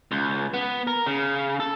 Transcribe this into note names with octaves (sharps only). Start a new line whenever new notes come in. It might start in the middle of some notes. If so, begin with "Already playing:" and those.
C#2
B3
A#4
C#3
A4